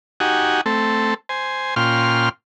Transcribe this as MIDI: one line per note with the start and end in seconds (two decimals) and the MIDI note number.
0.20 0.61 63
0.20 0.61 66
0.20 0.61 67
0.20 0.61 78
0.20 0.61 80
0.66 1.14 57
0.66 1.14 60
0.66 1.14 69
1.29 1.75 72
1.29 1.75 80
1.76 2.29 46
1.76 2.29 61
1.76 2.29 65
1.76 2.29 79
1.76 2.29 84
1.76 2.29 89